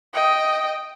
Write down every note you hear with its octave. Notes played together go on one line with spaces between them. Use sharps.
D#5 G5